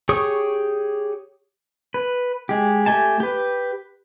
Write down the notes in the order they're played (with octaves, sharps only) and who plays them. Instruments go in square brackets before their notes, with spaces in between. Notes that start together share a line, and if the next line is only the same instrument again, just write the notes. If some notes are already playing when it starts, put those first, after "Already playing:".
[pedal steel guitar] G4 G#4 C#5 C#6 D#6
B4
G#3 G4
A3 G4 G#5 A5
G4 B4